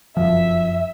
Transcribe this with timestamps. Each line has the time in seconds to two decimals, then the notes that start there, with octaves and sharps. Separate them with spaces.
0.17 F1 F#2 F3 E5